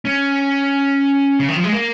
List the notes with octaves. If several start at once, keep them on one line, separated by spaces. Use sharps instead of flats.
C#4
C#3
D#3
F3
G#3
A#3